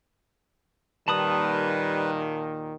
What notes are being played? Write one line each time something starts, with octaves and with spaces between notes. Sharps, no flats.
D#2 A#2 D#3 G3 B4 A5 B5 D#6